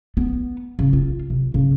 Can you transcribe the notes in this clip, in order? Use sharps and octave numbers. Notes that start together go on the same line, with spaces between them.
B3
C#3
F4
C3
C#3